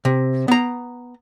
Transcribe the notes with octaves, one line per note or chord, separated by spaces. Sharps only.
C3
B3 A#5